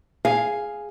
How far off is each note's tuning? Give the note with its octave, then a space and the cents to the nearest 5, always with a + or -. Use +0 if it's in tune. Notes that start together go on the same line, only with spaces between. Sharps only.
G#4 +0 F5 +0